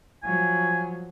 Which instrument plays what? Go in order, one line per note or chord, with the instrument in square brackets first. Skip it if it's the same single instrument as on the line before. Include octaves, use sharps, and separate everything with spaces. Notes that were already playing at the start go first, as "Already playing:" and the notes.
[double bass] F3 F#3 [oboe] G#5